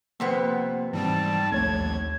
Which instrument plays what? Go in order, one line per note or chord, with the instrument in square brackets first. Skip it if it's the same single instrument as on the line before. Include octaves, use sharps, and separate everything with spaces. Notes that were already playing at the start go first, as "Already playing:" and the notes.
[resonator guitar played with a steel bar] F2 C3 B3 [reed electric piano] A#3 C5
[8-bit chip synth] G#2 G3 C4 [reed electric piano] E3 [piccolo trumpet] A5
[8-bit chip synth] A#1 D#2 [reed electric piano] A3 C#5 [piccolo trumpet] G#6